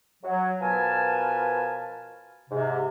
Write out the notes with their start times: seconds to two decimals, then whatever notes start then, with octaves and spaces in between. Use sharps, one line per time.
0.23 F#3
0.61 B2 F3 A#4 B4 G#5 A5
2.49 G#2 C3